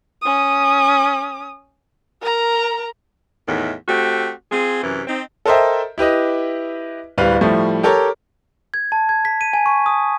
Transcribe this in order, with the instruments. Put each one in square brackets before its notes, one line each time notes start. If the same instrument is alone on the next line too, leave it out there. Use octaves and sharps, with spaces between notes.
[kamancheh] C#4 D#6
A#4 A#5
[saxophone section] E2 A2 D#3
A3 C4 F#4 G4
C4 F4 G#4
F#2 C3 E3
C4 D#4
[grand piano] A4 A#4 C5 D#5 E5 G5
E4 G4 B4 D#5
D1 G3 B4 F5
A2 F3 G3 A3
G4 A4 A#4 C#5
[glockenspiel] G#6
A5
G#6
B6
D#7
G#5
C#6
D#6